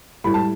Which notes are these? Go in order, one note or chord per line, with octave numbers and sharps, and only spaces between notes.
A2 G3 B5
A5